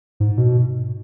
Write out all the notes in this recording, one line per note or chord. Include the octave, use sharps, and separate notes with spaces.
G#2
B2